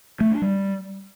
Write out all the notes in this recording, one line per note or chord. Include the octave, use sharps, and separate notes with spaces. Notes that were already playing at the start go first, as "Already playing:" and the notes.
A3
D4
G3